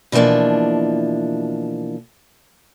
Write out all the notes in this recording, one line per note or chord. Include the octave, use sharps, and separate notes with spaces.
B2 E3 F3 A#3 D4